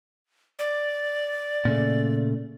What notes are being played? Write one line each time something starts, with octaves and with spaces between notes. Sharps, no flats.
D5
A#2 C#3 A3